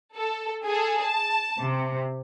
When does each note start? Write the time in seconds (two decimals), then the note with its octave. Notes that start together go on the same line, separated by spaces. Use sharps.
0.17 A4
0.64 G#4 A4
1.02 A5
1.59 C3